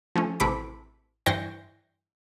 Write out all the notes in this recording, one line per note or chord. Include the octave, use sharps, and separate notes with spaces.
F3 A3 C#4
A1 C3 A3 E4 B5 D6
G2 E3 C5 G5 C#6 A#6